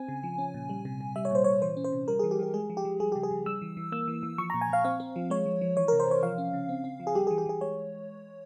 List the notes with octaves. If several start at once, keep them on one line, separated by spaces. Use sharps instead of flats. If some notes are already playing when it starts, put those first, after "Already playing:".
Already playing: C4 G#5
C#3
F3
C#4
A#2
G3
C3
C3
G3 E5
C#5
A#2 C5
A#2 C#5
E3 C5
C#4
C5
C3
G3 A#4
E3 G#4
G4
E3 G#4
G#3 G#4
F3
G4
F3
G3 G#4
C#3 G4
G#4
C#3
G3 E6
E3
E3
A#3 E6
E3
E3
F3 C#6
A#2 A#5
G#5
A#2 F5
C4 F5
C4
F3
G#3 C#5
F3
F3
E3 C#5
C3 A#4
C5
C3 C#5
F3 F5
C#4
C#3
C4
C4
F3
G#4
G3 G4
E3 G#4
G4
E3 G#4
G#3 C#5